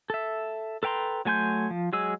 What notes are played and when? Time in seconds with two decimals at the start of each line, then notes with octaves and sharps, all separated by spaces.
0.10 A4 E5
0.83 A4 B4 G5 A#5 C6
1.25 F#3 A3 G#5 C6 G6
1.70 F3
1.93 F#3 G#3 G#4 E6